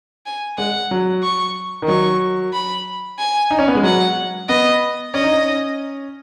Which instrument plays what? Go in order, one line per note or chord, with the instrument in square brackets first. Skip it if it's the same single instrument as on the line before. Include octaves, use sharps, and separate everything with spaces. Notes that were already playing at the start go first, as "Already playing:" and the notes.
[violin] G#5
[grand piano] G#3 [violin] F#5
[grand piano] F#3
[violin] C#6
[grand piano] D#3
[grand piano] F#3 [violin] C#6
[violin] B5
G#5
[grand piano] D#4
C#4
B3
G#3
[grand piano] F#3 [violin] F#5
[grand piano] B3 [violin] D#5
[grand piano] C#4 [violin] D#5
[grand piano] D#4
C#4